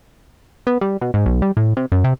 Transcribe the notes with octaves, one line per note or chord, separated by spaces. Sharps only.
B3
G3
B2
G#2
B1
G3
A2
C3
F#2
C3